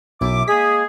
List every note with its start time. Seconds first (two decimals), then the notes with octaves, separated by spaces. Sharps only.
0.21 B1 F#2 E4 E5 D6
0.48 G#3 A#3 G#4 D#6 B6